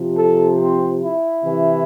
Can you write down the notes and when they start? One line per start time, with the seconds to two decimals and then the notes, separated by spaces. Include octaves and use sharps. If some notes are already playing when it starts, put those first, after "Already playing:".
Already playing: C3 F3
0.16 A4
0.58 C4
1.01 E4
1.43 C3 E3